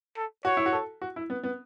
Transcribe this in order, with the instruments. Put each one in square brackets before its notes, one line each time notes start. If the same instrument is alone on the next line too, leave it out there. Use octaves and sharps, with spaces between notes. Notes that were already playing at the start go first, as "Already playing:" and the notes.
[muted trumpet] A4
[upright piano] F#4 [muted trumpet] C#5
[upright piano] E4
F#4
A4
F#4
E4
B3
B3